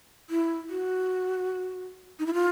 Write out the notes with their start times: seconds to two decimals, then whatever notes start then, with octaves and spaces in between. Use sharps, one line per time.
0.30 E4
0.70 F#4
2.19 D#4
2.26 E4
2.34 F4